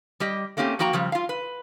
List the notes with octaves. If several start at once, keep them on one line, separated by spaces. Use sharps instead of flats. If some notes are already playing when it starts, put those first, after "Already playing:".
G3 G4 D#5
A3 A#3 C4 C#4 G4
F3 A#3 F#4 G5 A#5
C#3 F3 G3
F4 F5
B4